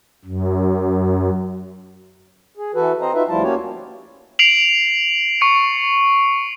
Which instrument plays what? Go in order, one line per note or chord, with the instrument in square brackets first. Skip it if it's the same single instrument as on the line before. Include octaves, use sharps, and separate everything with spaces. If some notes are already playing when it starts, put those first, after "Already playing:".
[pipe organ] F#2
[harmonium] G#4
E3 F#4 A4 B4
C4 C5 D#5 A#5
D#4 F4 F#4 B4 E5
D2 F3 G3 E4 F4 A5
A#3 C#4 F#4 G4 C#5
[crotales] C7 D7 F7 F#7
C#6 C#7